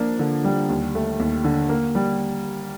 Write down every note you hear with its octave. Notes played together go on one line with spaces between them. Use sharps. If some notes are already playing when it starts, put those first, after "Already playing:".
Already playing: F3 A#3 D4
D3
G3
D#2
A3
D#2
D3
A#3
G3